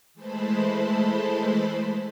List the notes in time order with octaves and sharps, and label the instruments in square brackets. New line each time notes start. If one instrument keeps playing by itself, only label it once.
[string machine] E3 G#3 A3 C5 A5 B5